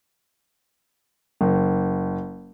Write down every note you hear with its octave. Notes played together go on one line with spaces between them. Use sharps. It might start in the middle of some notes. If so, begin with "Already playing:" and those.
F#1